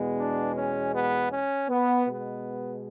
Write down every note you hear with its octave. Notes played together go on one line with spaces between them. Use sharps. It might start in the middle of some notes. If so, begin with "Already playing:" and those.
Already playing: E2 B2 G#3 B3
D4
C#4
B3
C#4
B3
B2 G#3 B3